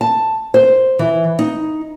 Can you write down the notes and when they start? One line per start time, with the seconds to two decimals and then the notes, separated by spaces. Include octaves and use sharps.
0.01 A5
0.54 C5
0.99 E3
1.39 D#4